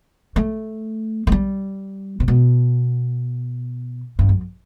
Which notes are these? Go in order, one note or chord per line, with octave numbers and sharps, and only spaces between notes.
A3
A3
G3
C3
B2
G2
F#2